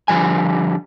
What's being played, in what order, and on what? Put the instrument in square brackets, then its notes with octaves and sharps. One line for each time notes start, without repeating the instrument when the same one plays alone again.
[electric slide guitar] D3 F3 G3 G#5